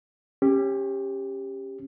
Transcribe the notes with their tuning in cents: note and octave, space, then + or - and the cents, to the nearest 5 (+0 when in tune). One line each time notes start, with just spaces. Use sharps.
C#4 -25 G4 +10